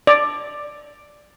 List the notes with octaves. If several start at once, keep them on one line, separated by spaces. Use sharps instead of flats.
D5